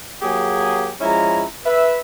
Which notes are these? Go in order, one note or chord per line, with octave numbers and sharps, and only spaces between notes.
F#3 A#3 G4 G#4
F3 G#3 C#4 E4 A#5
B4 E5